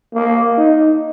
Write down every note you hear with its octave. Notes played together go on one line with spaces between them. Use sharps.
A#3
D#4